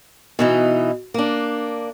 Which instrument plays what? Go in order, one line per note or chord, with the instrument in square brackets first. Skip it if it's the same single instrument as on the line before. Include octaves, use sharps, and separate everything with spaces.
[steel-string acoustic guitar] B2 E3 D#4
A#3 D4